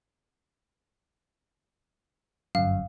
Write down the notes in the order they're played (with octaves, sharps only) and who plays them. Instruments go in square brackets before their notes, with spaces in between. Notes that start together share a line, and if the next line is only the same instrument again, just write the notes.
[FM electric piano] G1 F#2 [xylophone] F5